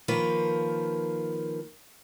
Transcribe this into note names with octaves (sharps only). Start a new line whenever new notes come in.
D#3 F3 A#3 B4